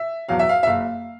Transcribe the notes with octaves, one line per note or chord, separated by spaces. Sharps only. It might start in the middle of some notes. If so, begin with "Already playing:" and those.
Already playing: E5
E2 B2 F#3 F5
E5
F5
E5
F#1 F5